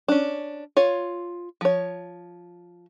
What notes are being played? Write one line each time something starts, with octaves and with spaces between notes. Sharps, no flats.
C#4 D4
F4 C#5
F3 C#5